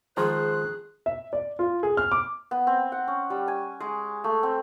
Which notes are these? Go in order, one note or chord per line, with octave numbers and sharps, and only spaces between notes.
D#3 F3 G#3 G#4 C5 F#6
E5
D5
F4
G#4
F6
D6
B3
C4
F#5
C#4
G3
G#5
G#3
A3
C4